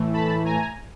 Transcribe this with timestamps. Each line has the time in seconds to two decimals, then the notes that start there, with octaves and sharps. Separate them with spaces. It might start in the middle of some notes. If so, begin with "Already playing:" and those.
Already playing: A2 E3 A3
0.13 A5 B5
0.45 G#5 A#5